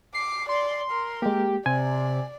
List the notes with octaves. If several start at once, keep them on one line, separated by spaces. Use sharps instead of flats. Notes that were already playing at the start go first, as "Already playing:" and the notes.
D6 C7
D5 C6
A#4
G#3 A#3 G4
C3 D5 G#5